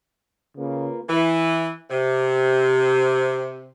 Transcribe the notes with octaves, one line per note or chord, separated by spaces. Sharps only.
C#3 A#3 F4 B4
E3
C3